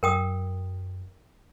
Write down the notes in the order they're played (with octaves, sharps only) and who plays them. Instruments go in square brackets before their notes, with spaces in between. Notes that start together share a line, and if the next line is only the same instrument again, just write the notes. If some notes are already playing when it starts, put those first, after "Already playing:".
[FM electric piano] F#2 [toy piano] A#4 G5 D#6